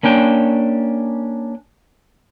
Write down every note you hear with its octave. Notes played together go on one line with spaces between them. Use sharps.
A#3 C#4 D4 G5